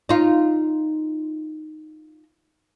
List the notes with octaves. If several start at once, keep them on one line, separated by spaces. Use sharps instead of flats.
D#4 F4